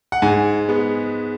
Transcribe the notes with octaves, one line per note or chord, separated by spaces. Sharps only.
F#5
G#2 G#5
G#3 B3